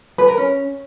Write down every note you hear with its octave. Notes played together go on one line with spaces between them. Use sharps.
B4
A#4
C#4